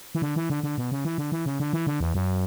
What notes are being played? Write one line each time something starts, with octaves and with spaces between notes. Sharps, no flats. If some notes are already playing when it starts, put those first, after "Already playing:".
E3
D3
E3
D3
D3
B2
C#3
E3
D3
E3
C#3
D3
E3
D3
E2
F#2